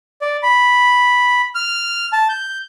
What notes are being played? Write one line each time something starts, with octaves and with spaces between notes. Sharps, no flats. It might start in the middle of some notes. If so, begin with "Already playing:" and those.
D5
B5
F6
A5
G6